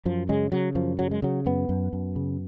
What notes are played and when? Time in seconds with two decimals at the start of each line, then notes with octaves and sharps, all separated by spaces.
0.05 F#2 F3
0.29 C#3 G#3
0.52 C#3 F#3
0.75 F#2 F3
0.99 C#3 F#3
1.11 G#3
1.22 C#3 F#3
1.46 F#2 B3
1.69 F#2
1.93 F#2
2.16 C#3